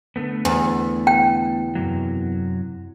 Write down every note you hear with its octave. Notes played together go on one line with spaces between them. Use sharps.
D3 A3 B3
E2
G5
F#2 C3 F#3